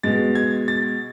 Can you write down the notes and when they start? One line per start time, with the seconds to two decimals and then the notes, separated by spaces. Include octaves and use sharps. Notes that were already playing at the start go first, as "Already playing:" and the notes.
0.03 B2 G#3 A6
0.35 G#6
0.68 A6